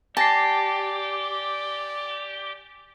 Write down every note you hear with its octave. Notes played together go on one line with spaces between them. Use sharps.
G4 D5 G#5 A5 A#6 C7